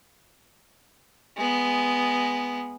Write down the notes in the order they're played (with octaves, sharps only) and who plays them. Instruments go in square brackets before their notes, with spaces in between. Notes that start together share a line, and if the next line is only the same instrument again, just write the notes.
[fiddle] G#3 B3